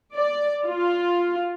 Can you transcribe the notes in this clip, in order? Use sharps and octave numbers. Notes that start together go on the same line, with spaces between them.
D5
F4